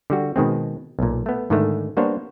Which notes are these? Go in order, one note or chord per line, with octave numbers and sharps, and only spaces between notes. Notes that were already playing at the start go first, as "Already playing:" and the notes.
D3 G3 F#4
B2 D#3 G#3 C4
B1 A#2
A3 B3
G#2 D3 D#3 G#3 A3
G3 A#3 B3 D4 C5 C#5